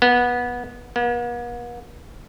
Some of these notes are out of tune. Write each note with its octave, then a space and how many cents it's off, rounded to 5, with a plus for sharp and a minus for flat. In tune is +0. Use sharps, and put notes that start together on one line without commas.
B3 -15
B3 -45